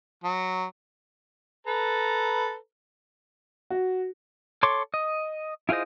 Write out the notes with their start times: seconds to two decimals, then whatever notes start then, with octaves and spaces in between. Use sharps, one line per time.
0.24 F#3
1.67 A4 B4 A#5
3.70 F#4
4.63 A4 C#5 C6 D6
4.94 D#5
5.69 E4 F4 G#4 C5 D#5